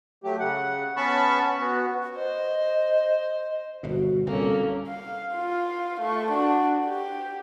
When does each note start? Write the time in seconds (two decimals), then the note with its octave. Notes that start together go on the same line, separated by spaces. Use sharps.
0.24 F#3 A3 G4
0.39 C#3 F#5
0.97 B3 C#4 A5 B5 C#6
1.59 B3 F#4
2.16 C5 D#5
3.83 G1 B2 F#4
4.27 C2 A#2 A#3 C#4 A4
4.87 F5
5.35 F4 F5
6.01 A3 C#6
6.31 D4 F#4
6.86 G4